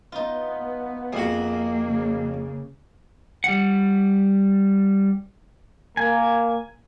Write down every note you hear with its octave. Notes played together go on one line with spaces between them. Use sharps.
B3 D#4 F4
F2 A#3 F#4 G#4
C#3
G3 F#5
A#3 A#4 G#5